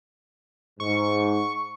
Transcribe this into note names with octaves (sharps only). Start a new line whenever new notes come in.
G#2 C#6